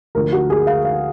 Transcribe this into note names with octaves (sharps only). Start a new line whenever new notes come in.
D2 D3 F3 A#4
F#4
G#4
F5
F5